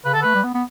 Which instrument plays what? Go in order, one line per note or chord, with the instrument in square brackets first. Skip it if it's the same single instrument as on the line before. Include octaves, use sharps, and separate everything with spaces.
[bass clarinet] C#3 [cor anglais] B4
[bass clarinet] D3 [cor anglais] A4
[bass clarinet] A3 [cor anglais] B4
[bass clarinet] G3
B3
B3